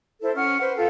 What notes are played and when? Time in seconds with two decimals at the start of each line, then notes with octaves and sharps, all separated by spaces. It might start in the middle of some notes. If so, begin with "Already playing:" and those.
0.22 E4 A4 C5
0.35 C#4 F#5 F6
0.60 B4 C5
0.76 F4 A4 G5